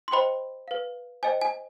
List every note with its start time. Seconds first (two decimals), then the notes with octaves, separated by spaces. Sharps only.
0.08 C6
0.12 C5 D#5 G5 B5
0.68 B4 F5
1.23 C5 D#5 G5 G#5
1.41 G#5